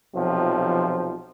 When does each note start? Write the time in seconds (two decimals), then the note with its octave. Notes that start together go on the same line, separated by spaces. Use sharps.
0.15 B1 C3 F3